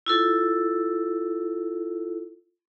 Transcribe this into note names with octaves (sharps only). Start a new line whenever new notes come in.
E4 F4 A4